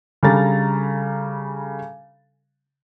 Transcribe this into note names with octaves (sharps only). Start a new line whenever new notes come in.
C#3 G3 D4 A4 A#5 A6